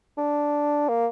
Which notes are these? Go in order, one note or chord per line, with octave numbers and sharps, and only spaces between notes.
D4
A#3